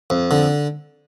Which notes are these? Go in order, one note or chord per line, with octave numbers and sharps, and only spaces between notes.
F2
D3